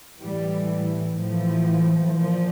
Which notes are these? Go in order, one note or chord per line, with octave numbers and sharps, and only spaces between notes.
A2 E3 G3
A2 E3 F3
A#2 F3